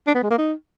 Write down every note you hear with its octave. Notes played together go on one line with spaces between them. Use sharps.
D4
B3
G#3
A#3
D#4